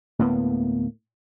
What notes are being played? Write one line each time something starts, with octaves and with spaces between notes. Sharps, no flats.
D2 A2 A#3 B3